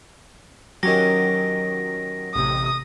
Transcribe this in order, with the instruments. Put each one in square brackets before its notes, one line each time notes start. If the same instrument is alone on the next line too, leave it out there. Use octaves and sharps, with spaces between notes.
[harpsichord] D#3 G4 [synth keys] F#3 C#4 D#5 [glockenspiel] A#6
[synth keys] A1 C3 [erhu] D#6